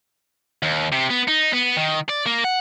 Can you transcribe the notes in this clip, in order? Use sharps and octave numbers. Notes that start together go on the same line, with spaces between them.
D#2
C3
B3
D#4
B3
D#3
D5
A#3
F#5